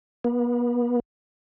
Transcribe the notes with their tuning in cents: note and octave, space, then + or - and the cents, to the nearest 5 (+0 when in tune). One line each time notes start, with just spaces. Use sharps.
B3 -40